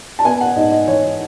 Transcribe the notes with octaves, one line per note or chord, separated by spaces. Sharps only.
A5
B3 G#5
F#5
G#2 D#5
D#5
E3 C#5